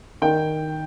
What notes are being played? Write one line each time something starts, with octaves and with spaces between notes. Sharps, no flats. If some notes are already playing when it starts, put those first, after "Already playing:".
D#3 G5